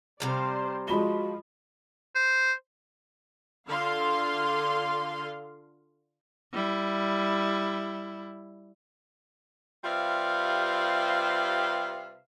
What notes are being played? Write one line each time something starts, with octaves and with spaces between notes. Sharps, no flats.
C3 G3 C5 D5 F5
F3 G#3 F#4 B5 G7
C5
D3 F4 F5 C6
G3 E4
C3 G3 F4 B4 E5 F5